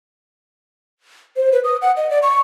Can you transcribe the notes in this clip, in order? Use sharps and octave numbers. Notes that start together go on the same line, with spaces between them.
C5
B4
D#6
F#5
D#5
D5
C#6